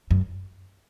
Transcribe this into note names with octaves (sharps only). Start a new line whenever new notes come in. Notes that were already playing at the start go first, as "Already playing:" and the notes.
F#2